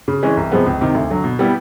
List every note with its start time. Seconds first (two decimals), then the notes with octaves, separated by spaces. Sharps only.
0.08 C#3
0.23 E3 G#3 C#4
0.37 C2
0.52 C3 F3 G#3 B3
0.66 C#2
0.81 C3 D#3
0.95 D2
1.10 D3 F#3
1.24 B2
1.39 G3 B3 E4 G4